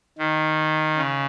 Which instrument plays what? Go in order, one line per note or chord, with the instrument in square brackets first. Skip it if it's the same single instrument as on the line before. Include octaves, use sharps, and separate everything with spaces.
[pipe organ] D#3
C#3